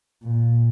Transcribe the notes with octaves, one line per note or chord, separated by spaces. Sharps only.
A#2